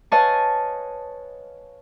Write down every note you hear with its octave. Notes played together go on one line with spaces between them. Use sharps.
B4 C#5 D#5 F5 G#5 A5